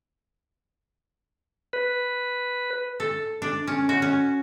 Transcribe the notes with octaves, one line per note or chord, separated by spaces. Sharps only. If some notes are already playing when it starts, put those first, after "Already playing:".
B4
A4
D4
C#4
F#4
C#4